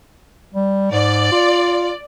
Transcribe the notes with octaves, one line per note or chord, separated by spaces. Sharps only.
G3
G#2 D5
F4